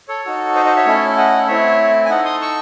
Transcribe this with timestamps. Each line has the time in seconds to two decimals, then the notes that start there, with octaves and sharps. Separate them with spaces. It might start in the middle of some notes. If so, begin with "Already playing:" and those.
0.08 A4 C#5
0.25 D#4 F#4 A4
0.55 C5 D#5
0.65 C5 D#5
0.76 C#5 E5
0.86 A3 C#4 E4 A4
1.18 D#5 F#5
1.47 A3 C4 E4 C#5 E5
2.06 G#5
2.10 D#4 A4 D#5 F#5
2.25 C6 D#6
2.41 C#6 E6